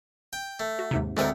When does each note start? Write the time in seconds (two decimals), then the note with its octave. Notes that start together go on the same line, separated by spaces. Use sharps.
0.33 G5
0.60 A3
0.79 F#4
0.91 D#2 G#2 C3
1.17 D2 G#3 A3 C4 A#4 C#5